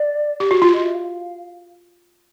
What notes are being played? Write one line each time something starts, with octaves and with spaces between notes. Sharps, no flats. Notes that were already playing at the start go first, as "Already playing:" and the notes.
Already playing: D5
G4
F#4
F4
D#5
E5
F5